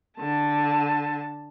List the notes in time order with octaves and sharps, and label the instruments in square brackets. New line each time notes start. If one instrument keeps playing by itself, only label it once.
[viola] D3 A5